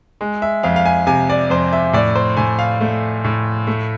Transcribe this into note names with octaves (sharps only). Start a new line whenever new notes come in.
G#3
E5
F2 F5
F5
G#5
C3 G#5
D5
F2 C5
E5
A2 D5
C5
A2 G#5
F5
A3
A2
A3